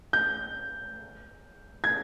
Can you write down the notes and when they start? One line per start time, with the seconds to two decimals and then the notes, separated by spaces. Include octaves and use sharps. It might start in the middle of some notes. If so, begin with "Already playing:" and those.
0.13 G6
1.84 G#6